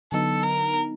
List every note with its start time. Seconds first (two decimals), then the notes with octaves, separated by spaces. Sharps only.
0.12 D3 F#3 B3 D#4 A4
0.43 A#4